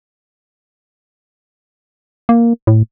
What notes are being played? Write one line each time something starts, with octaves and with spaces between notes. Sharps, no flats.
A#3
A2